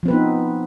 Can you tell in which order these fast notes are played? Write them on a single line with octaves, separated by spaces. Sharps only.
F3 C4 B4 B3 D#4